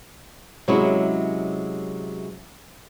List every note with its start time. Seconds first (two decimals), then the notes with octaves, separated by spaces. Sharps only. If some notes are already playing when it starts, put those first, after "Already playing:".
0.68 C3 F#3 G#3 C#4 E4 F#4